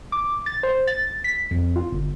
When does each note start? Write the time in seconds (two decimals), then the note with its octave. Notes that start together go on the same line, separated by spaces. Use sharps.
0.12 D6
0.46 A6
0.63 C5
0.87 A6
1.24 B6
1.51 F2
1.76 F4
1.92 G1